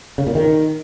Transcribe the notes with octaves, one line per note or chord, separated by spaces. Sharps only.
C#3
A#2
D#3